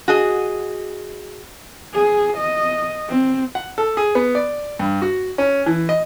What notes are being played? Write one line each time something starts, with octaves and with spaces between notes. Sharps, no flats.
F#4 G#4 D#5
G#4
D#5
C4
F#5
A4
G#4
B3
D5
G2
F#4
C#4
E3
D#5